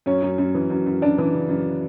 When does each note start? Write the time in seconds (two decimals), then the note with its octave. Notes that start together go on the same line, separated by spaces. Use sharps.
0.06 F#2 C#4 C#5
0.22 F#2
0.38 F#2
0.54 E3
0.70 F#2
0.86 F#2
1.02 F#2 D4 D5
1.18 E3
1.34 C#3
1.49 F#2